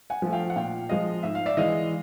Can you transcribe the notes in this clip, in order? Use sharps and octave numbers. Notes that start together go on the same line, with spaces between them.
F#5 G#5
F3 A3
F5 G5
F#5
A#2 F5 G5
F3 G#3 D#5 F5
G#2 E5
F5
D5 E5
E3 G#3 D#5 F5